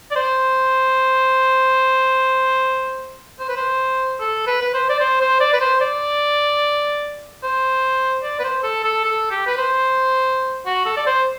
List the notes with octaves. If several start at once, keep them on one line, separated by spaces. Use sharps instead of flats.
D5
C5
C5
B4
C5
A4
B4
B4
C5
D5
C5
C5
D5
B4
C5
D5
C5
D5
B4
C5
A4
A4
A4
G4
B4
C5
F#4
A4
D5
C5